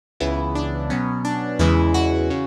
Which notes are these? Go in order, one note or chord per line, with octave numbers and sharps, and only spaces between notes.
C#2 C#3 E3 B3 E4
D4
B2 F#3 B3 C#4
D4
E2 C#3 E3 G#3 E4
F#4
C#3